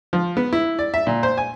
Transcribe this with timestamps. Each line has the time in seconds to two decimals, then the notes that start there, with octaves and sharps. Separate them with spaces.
0.13 F3
0.37 B3
0.53 E4
0.79 D5
0.94 E5
1.07 A#2
1.23 C5
1.38 G#5